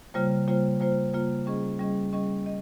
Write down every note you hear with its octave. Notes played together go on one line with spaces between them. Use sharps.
C#3 G3 A#3 F4 C5
C#3 G3 A#3 F4 C5
C#3 G3 A#3 F4 C5
C#3 G3 A#3 F4 C5
G3 C#4 G#4 D#5
G3 C#4 G#4 D#5
G3 C#4 G#4 D#5
D#5